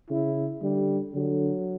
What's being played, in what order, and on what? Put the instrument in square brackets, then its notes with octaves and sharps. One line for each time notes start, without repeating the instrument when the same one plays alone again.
[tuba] C#3 [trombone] E4
[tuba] D3 [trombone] G3
[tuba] D3 [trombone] F#3